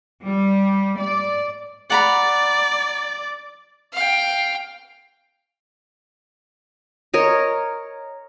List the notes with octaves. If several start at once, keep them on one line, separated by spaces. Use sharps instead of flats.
G3
D5
D5 F#5 A#5 B5
F5 G5
A#4 C#5 D#5